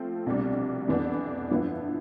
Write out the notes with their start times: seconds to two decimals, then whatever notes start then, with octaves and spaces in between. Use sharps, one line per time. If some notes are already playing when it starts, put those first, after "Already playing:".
Already playing: F3 A3 C4
0.26 C2 B2 G3 D4
0.88 F2 E3 B3 D4
1.49 G2 D3 F3 B3 E4